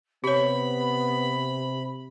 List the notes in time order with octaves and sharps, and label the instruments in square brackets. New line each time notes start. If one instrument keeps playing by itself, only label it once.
[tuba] C3 [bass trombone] B3 [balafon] G4 C#5 [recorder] B5